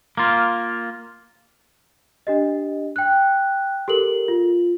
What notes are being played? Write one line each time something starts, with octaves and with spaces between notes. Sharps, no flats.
A#3 F4
D4 G4 D#5
G5 F#6
G4 A4 A#4 F#7
F4